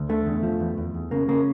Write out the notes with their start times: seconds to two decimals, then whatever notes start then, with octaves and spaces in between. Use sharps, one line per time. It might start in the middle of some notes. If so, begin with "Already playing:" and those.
Already playing: D2
0.09 D3 A3
0.26 E2
0.43 F3
0.60 E2
0.78 E2
0.94 E2
1.11 C#3 A#3
1.29 C#3 A#3